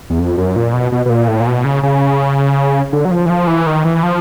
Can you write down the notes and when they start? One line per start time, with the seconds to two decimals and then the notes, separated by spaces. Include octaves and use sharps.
0.10 E2
0.19 F2
0.38 F#2
0.56 A#2
0.73 B2
0.92 B2
1.06 B2
1.10 A#2
1.28 A2
1.40 A#2
1.47 B2
1.64 C#3
1.83 C#3
2.93 D3
3.05 F#3
3.11 F3
3.26 E3
3.30 F3
3.47 E3
3.67 D#3
3.84 E3
4.03 F3